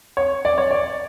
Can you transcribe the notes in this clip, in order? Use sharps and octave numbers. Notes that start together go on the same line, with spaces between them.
C#5
D5
C#5
D5